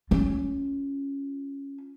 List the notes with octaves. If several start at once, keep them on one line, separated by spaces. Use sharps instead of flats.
C#4 F4